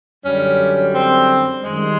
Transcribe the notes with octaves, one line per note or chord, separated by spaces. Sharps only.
F#2 D3 G3 C#4
C4
F#2 D#3 G3 G#3